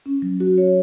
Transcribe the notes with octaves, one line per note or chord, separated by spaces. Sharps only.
C#4
F#3
F#4
C#5